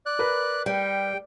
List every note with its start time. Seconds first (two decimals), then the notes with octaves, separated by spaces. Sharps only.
0.06 D5 F#6
0.19 A#4 B4
0.66 G3 G5